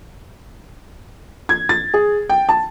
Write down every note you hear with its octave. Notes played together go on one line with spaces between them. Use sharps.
G#6
A6
G#4
G5
A5